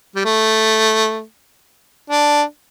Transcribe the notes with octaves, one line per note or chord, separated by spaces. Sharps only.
G3
A3
D4